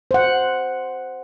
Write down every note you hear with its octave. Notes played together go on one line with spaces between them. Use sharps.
C5 F#5